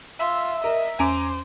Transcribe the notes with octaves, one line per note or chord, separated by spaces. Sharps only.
F4 E5
A#4 D#5
E2 C#4 C5 G#5 A#5 D6 D7